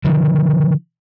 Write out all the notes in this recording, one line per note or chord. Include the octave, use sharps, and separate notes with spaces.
D3 D#3 F3